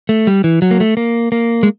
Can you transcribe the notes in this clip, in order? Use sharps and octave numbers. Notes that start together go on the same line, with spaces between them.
A3
G3
E3
F#3
A#3
A3
A#3
A#3
G#3